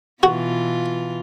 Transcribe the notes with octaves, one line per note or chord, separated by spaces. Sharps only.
B2 E3 F4 F#4